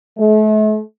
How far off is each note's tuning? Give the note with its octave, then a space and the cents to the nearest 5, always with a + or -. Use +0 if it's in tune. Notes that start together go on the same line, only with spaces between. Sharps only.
A3 -40